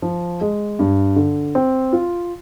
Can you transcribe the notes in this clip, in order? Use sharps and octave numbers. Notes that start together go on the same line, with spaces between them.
F3
G#3
G2
D3
C4
F4